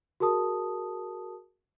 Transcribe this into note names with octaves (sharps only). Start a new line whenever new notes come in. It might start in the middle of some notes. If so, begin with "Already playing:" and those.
F#4 G#4 A#4 A5 D#6